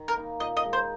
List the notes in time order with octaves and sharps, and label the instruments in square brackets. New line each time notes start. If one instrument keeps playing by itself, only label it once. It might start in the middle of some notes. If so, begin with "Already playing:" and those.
Already playing: [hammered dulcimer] D#3
[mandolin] A#4
[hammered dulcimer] A#3 D#4
[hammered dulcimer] A#2 [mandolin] D#5
[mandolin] D#5
[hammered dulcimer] G#3 D#4
[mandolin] C5